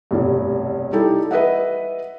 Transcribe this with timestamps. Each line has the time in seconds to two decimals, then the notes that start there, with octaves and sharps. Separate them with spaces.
0.11 F1 B1 G2
0.93 G3 D#4 E4 G4 A4
1.31 B4 D#5 E5 F#5